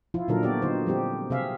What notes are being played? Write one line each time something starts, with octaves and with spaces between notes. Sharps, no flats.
F3 E4 F4
A#2 D3 F#3 D#4 A4 A#4
B3 F#4 G4 D5
D3 D#4 C5
F3 G3 C4 G4
C3 C4 G#4 E5 F5